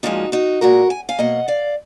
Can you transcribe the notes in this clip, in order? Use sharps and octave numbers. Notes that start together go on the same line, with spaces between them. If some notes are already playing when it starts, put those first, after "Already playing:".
A#2 F3 G#3 D#4 F#4
D#4 F#4
A#2 F3 G#3 F#4 A#4
G#5
F5 G#5
B2 F#3 A#3 D#5 F#5
D5 F5